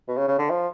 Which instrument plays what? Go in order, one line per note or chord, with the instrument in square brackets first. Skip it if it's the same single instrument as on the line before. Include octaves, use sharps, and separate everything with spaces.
[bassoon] B2
C#3
C#3
D3
F3